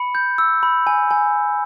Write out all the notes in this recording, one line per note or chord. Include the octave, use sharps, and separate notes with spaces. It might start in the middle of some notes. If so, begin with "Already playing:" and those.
Already playing: B5 C#7
G6
E6
B5
G#5
G#5